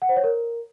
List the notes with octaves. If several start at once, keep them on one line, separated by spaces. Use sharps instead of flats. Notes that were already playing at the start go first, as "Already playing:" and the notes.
F#5
C5
C#5
A#4